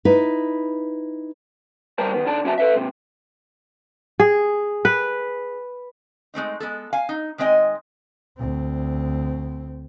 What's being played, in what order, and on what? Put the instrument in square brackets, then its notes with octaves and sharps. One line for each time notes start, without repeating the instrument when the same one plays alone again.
[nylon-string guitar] D#4 E4 B4
[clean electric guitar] G2 G3 A#4 C5 A5
D#3 B3
D3 D#4 D5 A5
F#2 C#4 F#4 E5 A5
A4 B4 E5
G#2 C3
[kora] G#4
B4
[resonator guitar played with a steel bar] G#3 A3 C4 D#4
G#3 B3 A4
F5 G#5
D#4
D#3 G#3 C4 D#5 G#5
[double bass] D2 C4